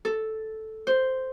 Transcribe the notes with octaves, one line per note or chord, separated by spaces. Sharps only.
A4
C5